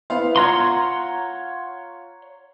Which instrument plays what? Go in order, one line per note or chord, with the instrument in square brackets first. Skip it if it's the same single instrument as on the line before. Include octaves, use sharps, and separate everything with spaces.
[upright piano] B3 F5 [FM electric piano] E4 C5
[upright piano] F4 [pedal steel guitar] C#5 A#5 C6 [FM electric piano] F5 F#5 C#6